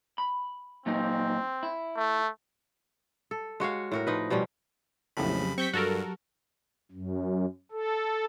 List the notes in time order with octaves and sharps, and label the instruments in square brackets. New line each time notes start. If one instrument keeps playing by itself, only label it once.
[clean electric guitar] B5
[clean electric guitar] A#2 F#3 D#4 [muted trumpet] C4
[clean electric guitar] E4
[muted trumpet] A3
[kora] A4
G#3 F#4 C#5 F5
A2 F#4 A#4
F3 D#4 B4
B2 F3 G3 C#4
[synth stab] A#1 A2 [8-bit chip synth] F2 C#3 B5 [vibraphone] F#3 G4
[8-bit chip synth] C4 [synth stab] C#6 G6 B6
[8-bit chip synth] G2 [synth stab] F#4 A4 A#4
[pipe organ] F#2
A4